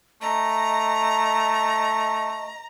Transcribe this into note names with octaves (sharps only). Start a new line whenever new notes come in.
A3 D#5 A#5